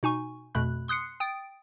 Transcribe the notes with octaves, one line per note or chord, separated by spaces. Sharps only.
B2 D#4 G#5 C#6
F2 B2 A3 B5 F#6
C6 D#6 F#6 C7 C#7
G5 D#6 A6 D7